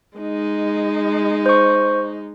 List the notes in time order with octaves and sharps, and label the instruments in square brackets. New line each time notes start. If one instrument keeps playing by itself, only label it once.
[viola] G#3 D#4
[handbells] C5 C#6